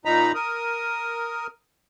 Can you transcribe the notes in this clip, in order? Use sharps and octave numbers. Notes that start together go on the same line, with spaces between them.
A#2 D#4 A#5 B5
A#4 D#6